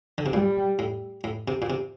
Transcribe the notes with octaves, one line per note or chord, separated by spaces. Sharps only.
D3
C3
A#2 G3
A2
A2
C3
A#2
C3